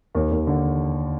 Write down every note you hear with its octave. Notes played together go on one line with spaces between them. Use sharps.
D#2
D#2
D3